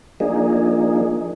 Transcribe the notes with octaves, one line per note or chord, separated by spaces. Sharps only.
F3 A#3 D4 D#4 G#4